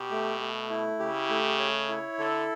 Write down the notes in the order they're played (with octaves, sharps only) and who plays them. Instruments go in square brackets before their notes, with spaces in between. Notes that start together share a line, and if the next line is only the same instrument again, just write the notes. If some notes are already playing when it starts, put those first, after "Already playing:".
Already playing: [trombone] B2 [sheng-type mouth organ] G4
[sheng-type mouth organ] A3
A3
E4
[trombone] C#3 [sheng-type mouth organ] G4
[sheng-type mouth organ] A3
C#5
E4
[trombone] D3 [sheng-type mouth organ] A4